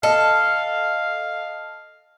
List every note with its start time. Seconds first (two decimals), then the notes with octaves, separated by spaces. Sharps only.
0.03 A4 D#5 F5 A5